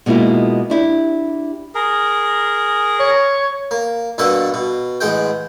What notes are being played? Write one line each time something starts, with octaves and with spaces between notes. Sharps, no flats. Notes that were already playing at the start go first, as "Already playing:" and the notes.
B2 G#3 A#3 E4 F4
D4 E4 G4
G#4 A#4
C#5
A#3
G2 B2 A#3 A4 F#5
B2
A1 G#3 F#5 G5